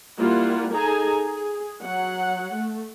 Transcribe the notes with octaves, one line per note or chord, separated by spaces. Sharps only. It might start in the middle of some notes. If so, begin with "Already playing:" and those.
G3 A#3 E4 F4 F#5
D#4 G#4 A4 G#5 A#5
G#4
F#3 F#5
A3